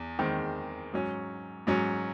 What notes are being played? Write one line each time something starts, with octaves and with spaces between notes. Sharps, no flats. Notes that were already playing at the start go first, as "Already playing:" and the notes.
Already playing: E2
E2 D#3 G#3 C4
G#2 F#3 C#4
G#2 F#3 C#4